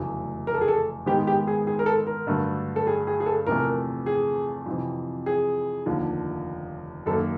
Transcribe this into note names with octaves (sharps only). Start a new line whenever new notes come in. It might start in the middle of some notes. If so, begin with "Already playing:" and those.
Already playing: F1 E2 C#3 F#3 A3
A#4
A4
G#4
A4
G#2 D#3 G#3 B3 G4
G4
G#4
G#4
A#4
A4
A#4
G2 D3 F#3 A3
A4
G#4
G#4
G#4
A4
E2 C3 F3 A3 A#4
G#4
F2 C3 E3
G#4
F1 D#2 D3 F3
F#2 D#3 F#3 A#3 A4